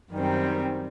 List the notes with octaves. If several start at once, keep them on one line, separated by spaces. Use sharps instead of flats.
F#2 D#3 G3 C4